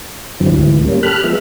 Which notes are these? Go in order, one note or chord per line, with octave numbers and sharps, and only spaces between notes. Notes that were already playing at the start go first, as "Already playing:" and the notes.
F#2 D3 E3 F#3 C4
D2 G#2 E3
G3 A#3 C#4
G4 A4 B5 F6 F#6
F3 G#3 B3 E5